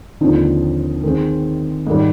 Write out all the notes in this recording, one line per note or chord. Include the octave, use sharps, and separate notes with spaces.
D#2 D3 F3 C4 D#4
D#3 G#3 C4
G#2 D#3 G3